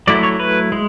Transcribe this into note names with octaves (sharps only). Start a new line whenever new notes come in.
F#3 A3 E4 D5
C#5
B4
G#3